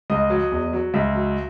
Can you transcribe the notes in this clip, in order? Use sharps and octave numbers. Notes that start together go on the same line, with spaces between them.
C#2 D#5
F#3
E2
F#3
C#2 E5
F#3